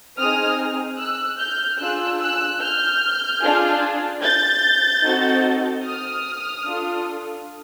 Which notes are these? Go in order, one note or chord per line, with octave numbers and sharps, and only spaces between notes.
C4 D#4 G#4 D#6 F6
E6 F#6
F6 G6
D4 F4 G#4 E6 F#6
E6 F#6
F6 G6
D4 F4 G#4
G6 A6
C4 D#4 F#4 A4
D#6 F6
D4 F4 A4